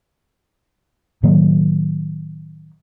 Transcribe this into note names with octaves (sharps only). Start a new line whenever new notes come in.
A2 D#3 F#3 A#3